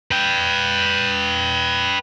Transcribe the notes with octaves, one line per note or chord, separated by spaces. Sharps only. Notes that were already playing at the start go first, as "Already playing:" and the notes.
B4 G5